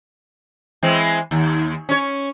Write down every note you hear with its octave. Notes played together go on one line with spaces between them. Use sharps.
E3 G#3 C4
D#2
C#4 C#5